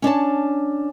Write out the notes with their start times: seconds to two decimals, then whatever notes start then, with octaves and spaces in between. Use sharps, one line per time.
0.02 C#4 D4 C#5 A5